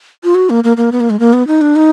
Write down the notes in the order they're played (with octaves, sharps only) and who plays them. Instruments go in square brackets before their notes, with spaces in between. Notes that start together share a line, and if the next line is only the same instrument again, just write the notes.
[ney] F4
F#4
A#3
A#3
A#3
B3
A#3
G#3
A#3
B3
D#4
D4
D#4